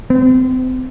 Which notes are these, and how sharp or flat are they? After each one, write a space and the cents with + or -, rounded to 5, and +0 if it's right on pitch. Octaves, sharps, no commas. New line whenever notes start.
C4 -35